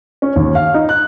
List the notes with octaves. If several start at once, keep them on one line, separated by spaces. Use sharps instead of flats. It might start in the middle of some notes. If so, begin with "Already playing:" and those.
C#4
D#2
F5
D#4
F#6